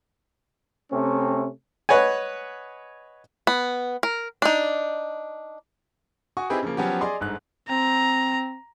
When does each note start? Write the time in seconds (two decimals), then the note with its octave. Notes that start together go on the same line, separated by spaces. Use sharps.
0.90 C3 A3 C4 C#4
1.89 B4 C#5 D#5 F#5 G#5
3.47 B3
4.03 A#4
4.42 D4 D#4
6.37 F#4 G#5 C#6 D#6
6.50 C4 D#4 E4 G4 G#4 B4
6.63 C#3 F3 A#3
6.77 F3 F#3 B3 C#4 F#4 G4
7.01 G#4 D5 D#5 C6 D#6
7.21 G1 G#2 F#6
7.69 C4 A#5